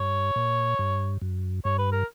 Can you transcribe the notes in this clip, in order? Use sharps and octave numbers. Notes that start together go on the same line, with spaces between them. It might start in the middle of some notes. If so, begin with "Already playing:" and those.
Already playing: G2 C#5
A#2
G2
F#2
G2 C#5
B4
A#4